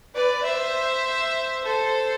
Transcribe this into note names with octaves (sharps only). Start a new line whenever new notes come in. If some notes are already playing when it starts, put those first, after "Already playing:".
B4 D5
C5 E5
A4 C5